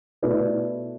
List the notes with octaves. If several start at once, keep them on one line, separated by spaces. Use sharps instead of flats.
B2 A3 E4 B4 D5